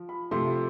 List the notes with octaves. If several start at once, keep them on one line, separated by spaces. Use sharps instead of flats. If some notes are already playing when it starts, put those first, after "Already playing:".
Already playing: F3
B5
C3 F3 A3 C6